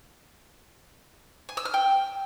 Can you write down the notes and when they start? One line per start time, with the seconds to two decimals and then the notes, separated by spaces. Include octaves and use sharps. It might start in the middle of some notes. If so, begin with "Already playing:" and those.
1.49 G#5
1.57 E6
1.65 F6
1.74 G5